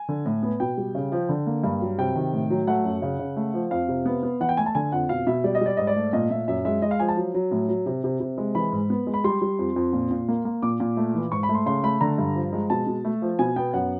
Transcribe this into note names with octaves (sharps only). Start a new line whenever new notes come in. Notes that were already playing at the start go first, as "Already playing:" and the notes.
Already playing: G#5
D3
A2
B3
B2 G5
G3
C#3
F3
D3
A#3
G2
F#3
C3 G5
D#3
A2
F#3
A3 F#5
F#2
C#3
C#3
A3
F3
F2 F5
C3
B3
B3
E3 F#5
G5
A3 G#5
A5
D3 G#5
F2 F#5
B2 F5
B2 E5
G3 D5
D#5
G3 D5
G#2 D#5
D5
A3
A#2 D#5
A#2 E5
F#2 E5
G#3 E5
G#3 D#5
F5
F3 G#5
A5
F#3
F#3
A2
F#3
C3
C3
C3
G#3
E3 B5
G#2
B3
G#3
B5
G3 C6
G3
F2
F2
A#2
A#2
A#3
A#3
A#2 D6
A#2
A3
E3
G#2 C#6
B5
A3
C6
C#3 C6
A3 B5
D3 A#5
G2
F3
G#3
B2 A5
B2
A3
F3
B2 G#5
B3 G5
F#2 F#5